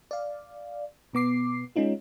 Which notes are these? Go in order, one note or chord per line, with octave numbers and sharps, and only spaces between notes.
D5 F5
B2 B3 D6 C7
G#3 C#4 D#4 F4